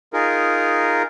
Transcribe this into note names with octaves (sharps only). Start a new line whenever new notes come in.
D#4 F4 G#4 A#4